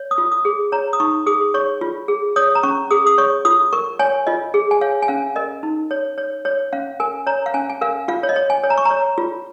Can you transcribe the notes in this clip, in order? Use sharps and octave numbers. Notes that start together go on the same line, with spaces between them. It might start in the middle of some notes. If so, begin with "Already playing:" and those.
Already playing: C#5
D#6
F4
D#6
G#4
C#5 A#5
D#6
D#4 C#6
G#4 D#6
C#5 C#6
F4
G#4
C#5 D#6
A#5
C#4 C#6
G#4 D#6
D#6
C#5 C#6
F4 D#6
A#4 C#6
C#5 G#5
F4 D#5
G#4
G#5
C#5 F5
G#5
C#4 F5
A#4 D#5
D#4
C#5
C#5
C#5
C#4 F5
A#4 G#5
C#5 A#5
F5
C#4 G#5
G#5
A#4 F5
F4 F5
C#5
D#5
C#5
G#5
C#5
A#5
C#6
A#5
C#5
F4